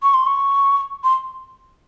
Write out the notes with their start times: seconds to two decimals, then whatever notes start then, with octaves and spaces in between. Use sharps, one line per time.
0.03 C#6
0.14 C6
0.26 C#6
1.04 C6